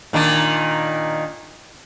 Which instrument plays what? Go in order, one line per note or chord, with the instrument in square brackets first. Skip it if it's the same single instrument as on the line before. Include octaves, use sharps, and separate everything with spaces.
[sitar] A#2 D#3 D4